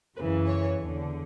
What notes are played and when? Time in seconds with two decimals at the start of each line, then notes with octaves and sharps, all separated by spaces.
0.17 F#2 C#3 E3 B4
0.47 C#5
0.77 E2 D3